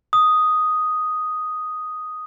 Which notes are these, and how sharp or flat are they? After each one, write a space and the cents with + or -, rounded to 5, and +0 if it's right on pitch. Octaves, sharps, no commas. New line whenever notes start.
D#6 +0